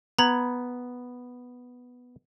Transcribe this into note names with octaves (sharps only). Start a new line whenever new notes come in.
B3 A#5 B5 G#6